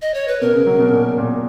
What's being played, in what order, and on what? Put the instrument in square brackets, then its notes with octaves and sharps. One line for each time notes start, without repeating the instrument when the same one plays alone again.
[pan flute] D#5
C#5
B4
[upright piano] B2 [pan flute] A#4
[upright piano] C#3
F#3
B2
A#2
A#2